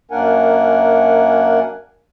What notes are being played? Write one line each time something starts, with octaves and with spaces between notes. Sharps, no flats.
F#2 A#3 D4 A#4 F#5 G#5